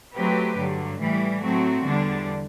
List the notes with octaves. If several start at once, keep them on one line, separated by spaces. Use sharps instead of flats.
F#3 A3 C4 G4 B4
G2 D3 F#3
A2 E3 G3
A2 F#3 A3 C4 F#4
E2 D3 G3 D4